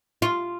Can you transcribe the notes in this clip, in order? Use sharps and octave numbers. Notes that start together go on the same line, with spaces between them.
F4